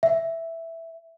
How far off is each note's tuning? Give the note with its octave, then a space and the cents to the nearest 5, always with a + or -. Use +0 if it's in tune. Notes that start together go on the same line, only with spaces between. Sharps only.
E5 +0